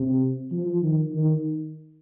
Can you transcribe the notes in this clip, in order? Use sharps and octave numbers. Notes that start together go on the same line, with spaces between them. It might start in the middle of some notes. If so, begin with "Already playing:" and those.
Already playing: C3
F3
D#3
D#3